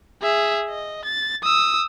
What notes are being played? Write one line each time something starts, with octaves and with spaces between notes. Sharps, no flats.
G#4 E5
D#5
A6
D#6 E6